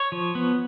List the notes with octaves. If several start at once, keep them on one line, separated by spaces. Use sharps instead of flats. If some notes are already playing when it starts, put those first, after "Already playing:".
Already playing: C#5
F3
B3